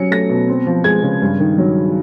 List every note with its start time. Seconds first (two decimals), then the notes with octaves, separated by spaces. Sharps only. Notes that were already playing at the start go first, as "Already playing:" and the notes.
Already playing: F#3 C#4 C#7
0.11 A3 A#6
0.29 B2
0.48 C4
0.67 F3
0.84 G#3 G#6
1.03 C#3
1.22 G2
1.40 D#3
1.58 F#3